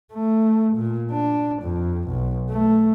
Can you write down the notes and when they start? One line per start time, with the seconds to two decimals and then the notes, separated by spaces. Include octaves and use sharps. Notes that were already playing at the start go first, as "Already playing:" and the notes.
0.13 A3
0.77 A#2
1.11 D4
1.63 F2
2.09 B1
2.50 A3